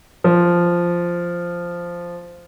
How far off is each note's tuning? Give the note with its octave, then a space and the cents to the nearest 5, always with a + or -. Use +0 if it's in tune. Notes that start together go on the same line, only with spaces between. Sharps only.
F3 -5